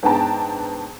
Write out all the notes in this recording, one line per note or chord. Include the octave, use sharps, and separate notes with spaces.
G#2 B3 D4 G5 A5 A#5